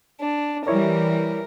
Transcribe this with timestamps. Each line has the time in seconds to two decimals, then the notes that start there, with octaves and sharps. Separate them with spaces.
0.20 D4
0.67 E3 G3 E4 A#4 C#5 D5